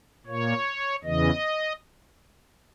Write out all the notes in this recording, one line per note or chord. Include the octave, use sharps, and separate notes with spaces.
A#2 A#3 C#5
E2 C#3 E3 D#5